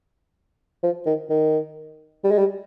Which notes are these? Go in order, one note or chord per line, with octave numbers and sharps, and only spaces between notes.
F3
D#3
D#3
G3
G#3
G3